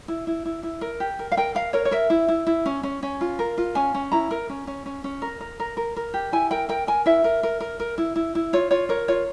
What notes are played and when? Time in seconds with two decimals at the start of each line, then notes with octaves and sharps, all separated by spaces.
0.08 E4
0.27 E4
0.45 E4
0.63 E4
0.81 A#4
1.00 G4
1.19 A#4
1.32 F5
1.37 A#4 G5
1.55 A#4 F5
1.73 A#4 C#5
1.85 C#5
1.91 A#4 E5
2.10 E4
2.28 E4
2.47 E4
2.66 C#4
2.83 C#4
3.03 C#4
3.21 F4
3.39 A#4
3.58 F4
3.75 C#4 G#5
3.94 C#4
4.12 E4 A#5
4.31 A#4
4.49 C#4
4.67 C#4
4.86 C#4
5.04 C#4
5.22 A#4
5.41 A#4
5.60 A#4
5.77 A#4
5.96 A#4
6.14 G4
6.32 E4 G#5
6.51 A#4 G5
6.69 A#4 G5
6.87 A#4 G#5
7.06 E4 E5
7.24 A#4
7.43 A#4
7.60 A#4
7.80 A#4
7.98 E4
8.16 E4
8.35 E4
8.53 F4 C#5
8.71 F4 C#5
8.89 A#4 C#5
9.08 F4 C#5